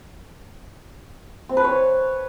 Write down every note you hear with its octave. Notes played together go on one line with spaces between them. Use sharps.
C4
B4
C#5